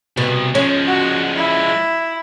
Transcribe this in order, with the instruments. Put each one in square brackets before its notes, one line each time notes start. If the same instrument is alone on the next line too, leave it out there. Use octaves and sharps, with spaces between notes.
[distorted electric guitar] C2 [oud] B2
[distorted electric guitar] F3 G#3 [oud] C#4
[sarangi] F#4
E4